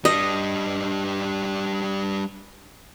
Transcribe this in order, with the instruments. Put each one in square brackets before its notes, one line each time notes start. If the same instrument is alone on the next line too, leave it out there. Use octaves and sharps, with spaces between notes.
[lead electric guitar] G3 D4 [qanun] D#5